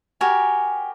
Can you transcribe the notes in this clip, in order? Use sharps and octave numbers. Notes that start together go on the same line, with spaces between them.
F#4 G4 A#4 G#5